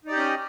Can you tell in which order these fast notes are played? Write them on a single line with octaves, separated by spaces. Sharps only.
D#4 D5 G4 D#5 C#4